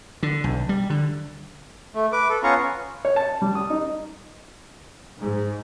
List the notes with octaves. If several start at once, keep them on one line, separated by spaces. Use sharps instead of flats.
D3
B1
G3
D3
A3
B4 D6
A4
B3 C#4 F4 F5 A#5 C#6
C#5
A5
G3
D#6
D#4
G#2